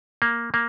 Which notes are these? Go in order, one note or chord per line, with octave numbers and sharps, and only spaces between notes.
A#3
A#3